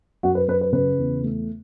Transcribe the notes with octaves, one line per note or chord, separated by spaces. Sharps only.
F#2 F#4
B4
F#2 B4
B4
C#3 B4
E2
A3